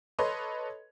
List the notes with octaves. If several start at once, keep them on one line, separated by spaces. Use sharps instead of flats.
A4 B4 C#5 D#5 C6